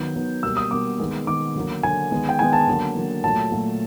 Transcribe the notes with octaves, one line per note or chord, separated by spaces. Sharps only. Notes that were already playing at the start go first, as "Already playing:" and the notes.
Already playing: D#3 F#3 B3 G6
D#3 F#3 B3
B2 G3 A#3 E6
D#6
B2 G3 A#3 D6
D#3 G#3 B3
D#3 G#3 B3 D6
D3 F#3 A#3
D3 F#3 A#3 G#5
D#3 G#3 B3
G5
D#3 G#3 B3 G#5
A5
D3 F#3 A#3
D3 F#3 A#3
A#2 F#3 A3 A5
A#2 F#3 A3